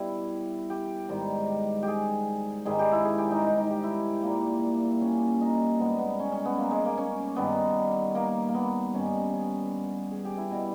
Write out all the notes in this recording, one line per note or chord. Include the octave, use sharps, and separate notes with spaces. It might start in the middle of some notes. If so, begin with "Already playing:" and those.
Already playing: B2 G3 E4 G4
G4
G#2 D#3 G3
G4
G#4
G#2 D#3 G3 G#4
G4
E4
G#4
G4
D#4
D#4
D#4
G4
E4
A#2 G3 A#3
C#4
D#4
G#2 G3 B3
B3
C#4
C#4
B3
A#3
G#3
A#3
C#4
G2 D#3 G3 B3
A#3
A#3
B3
G2 D#3 G3 C#4
C#4
G#4
G4
E4
B2 G3